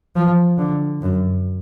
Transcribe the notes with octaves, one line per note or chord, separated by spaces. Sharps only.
F3
D3
F#2